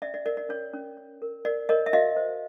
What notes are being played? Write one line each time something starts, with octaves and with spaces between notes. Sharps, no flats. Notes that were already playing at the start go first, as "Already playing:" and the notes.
C#4 D5 E5
D5
A#4 D5
D5
C#4 C#5
C#4
C#5
A#4
A#4 D5
A#4 C#5 D#5
E5
F#4 D#5 F5
C5